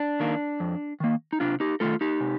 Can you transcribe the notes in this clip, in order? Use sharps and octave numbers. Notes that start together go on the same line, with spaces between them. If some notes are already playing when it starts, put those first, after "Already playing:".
Already playing: D4
D#3 A#3
F2
D#3 A#3
D#4
C3 D4 F4
D#4 G4
D#3 A3 F4 A4
D#4 G4
C3